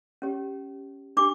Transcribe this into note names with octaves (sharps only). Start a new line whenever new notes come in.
C#4 G4 C#5
D4 G4 D6